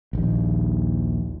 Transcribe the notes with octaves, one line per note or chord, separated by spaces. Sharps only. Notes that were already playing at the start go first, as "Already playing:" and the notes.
A#1 D#2